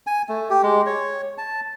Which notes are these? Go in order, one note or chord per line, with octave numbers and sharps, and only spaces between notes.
G#5
A3
G4
G#3
C#5
A5